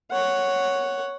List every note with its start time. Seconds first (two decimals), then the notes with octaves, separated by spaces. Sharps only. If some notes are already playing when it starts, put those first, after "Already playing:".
0.11 C#5 F#5